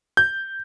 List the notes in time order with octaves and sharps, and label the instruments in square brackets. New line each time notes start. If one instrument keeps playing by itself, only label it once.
[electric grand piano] G6